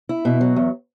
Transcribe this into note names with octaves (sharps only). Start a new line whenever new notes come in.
E4
B2
F#3
E2